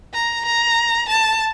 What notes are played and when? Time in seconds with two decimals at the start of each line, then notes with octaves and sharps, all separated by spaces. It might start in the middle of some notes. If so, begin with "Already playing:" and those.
0.14 A#5
0.46 A#5
1.09 A5